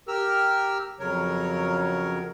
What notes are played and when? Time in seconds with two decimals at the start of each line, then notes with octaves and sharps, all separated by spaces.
0.08 G4 A#4 E6 F6
1.00 F2 C#3 F#3 A#4 C#5